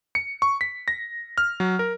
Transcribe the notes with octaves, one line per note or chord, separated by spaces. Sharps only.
C#7
C#6
B6
A#6
F6
F#3
A#4